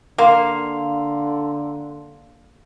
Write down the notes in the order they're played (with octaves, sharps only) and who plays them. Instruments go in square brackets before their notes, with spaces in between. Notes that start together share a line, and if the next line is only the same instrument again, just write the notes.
[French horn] D3 [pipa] A#3 [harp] F5 [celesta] A#5 C6